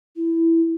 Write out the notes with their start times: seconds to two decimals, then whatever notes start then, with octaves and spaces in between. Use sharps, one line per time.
0.16 E4